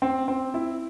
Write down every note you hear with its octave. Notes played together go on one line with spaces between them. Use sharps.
C4
C4
E4